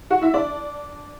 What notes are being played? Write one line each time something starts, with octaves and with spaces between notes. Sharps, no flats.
F#4 F#5
E4 E5
D4 D5